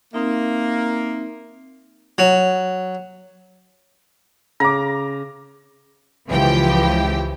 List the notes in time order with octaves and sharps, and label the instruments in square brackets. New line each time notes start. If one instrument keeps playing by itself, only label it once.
[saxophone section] A#3 [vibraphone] C4 D#4 E5
[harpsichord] F#3
[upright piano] C#3 D6 [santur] A#5
[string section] C#2 E3 F3 G4 G5